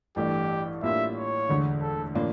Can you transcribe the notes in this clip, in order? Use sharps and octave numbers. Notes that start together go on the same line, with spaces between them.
A1 G2 E3 A3 G4
A2 G3 A#3 D4 F4 E5
C#5
E1 D2 D3
A4
A2 E3 A#3 D4 F4